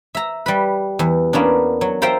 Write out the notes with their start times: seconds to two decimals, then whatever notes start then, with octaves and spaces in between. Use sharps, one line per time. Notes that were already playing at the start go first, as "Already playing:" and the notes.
0.15 E5 A#5
0.46 G3 B4
0.99 E2
1.33 A#3 B3 C#4 D4
1.81 F#3
2.02 F4 A#4 C5 E5 G5 A#5